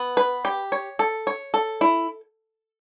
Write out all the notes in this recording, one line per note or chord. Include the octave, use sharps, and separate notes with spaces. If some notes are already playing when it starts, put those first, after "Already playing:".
Already playing: B3
B4
G4
C#5
A4
C#5
A4
E4